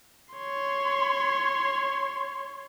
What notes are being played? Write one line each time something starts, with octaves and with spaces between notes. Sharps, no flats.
C#5 C6